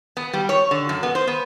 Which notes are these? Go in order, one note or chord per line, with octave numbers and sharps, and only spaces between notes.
B3
G3
C#5
D3
F#2
B3
C5
B3